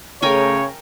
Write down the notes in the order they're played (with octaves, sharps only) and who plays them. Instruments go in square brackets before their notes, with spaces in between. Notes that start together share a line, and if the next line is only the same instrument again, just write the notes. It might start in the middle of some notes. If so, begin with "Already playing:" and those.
[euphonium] C#3 [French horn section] A3 G#4 [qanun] A#4 G5 G#5 [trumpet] C#5